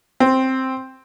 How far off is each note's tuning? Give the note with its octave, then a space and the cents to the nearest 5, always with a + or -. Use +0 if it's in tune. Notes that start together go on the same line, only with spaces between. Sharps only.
C4 +5